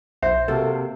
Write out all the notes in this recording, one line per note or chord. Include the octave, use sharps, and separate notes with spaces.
B1 C5 E5
C3 A#3 F#4 A4